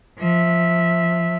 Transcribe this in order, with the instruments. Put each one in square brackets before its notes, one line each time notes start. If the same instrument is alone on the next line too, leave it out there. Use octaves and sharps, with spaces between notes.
[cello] F3 E5